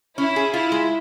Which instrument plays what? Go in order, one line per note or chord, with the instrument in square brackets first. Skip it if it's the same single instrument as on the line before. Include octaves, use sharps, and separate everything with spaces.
[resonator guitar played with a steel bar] C#4 [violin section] E4
[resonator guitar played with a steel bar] G#4
[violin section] E4 [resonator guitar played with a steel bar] F4
[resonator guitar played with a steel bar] G#3